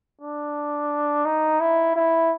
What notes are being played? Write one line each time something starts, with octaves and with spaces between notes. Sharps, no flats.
D4
D#4
E4
E4